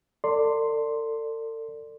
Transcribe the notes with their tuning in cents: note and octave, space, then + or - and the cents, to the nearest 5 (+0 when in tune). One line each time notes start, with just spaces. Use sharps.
A4 +40 D5 +0 C6 +0